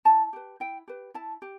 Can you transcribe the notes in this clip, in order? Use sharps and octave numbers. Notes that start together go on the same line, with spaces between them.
E4 A5
G4 B4
E4 G5
G4 B4
E4 A5
G4